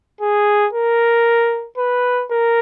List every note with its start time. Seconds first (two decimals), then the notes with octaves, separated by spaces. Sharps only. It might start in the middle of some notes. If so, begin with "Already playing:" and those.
0.21 G#4
0.73 A#4
1.78 B4
2.31 A#4